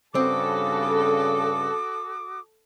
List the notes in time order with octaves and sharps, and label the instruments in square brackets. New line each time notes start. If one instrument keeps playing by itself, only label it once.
[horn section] G2 C#3 [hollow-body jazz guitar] C4 [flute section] F#4 D6 D#6 [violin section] A4